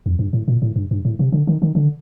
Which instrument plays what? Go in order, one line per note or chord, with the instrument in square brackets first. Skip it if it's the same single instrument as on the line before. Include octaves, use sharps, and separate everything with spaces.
[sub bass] F2
G2
A2
A#2
A2
G2
G2
A2
C3
D3
D#3
D#3
D3